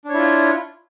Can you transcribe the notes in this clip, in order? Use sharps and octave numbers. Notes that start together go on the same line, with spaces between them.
D4 E4 F4 C#5